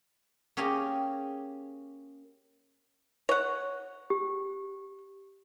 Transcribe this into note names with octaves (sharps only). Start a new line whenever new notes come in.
A#3 C#4 G4 G#4 A#4 G5
C#5 F#5
G4